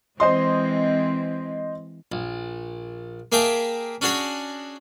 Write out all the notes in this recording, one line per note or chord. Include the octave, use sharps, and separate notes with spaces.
E3 G#3 C4 C5 D#5 C6
A#1
A#3 G#4 E5 G5 A5 A#5
C#4 D4 F#4 G#4 C#5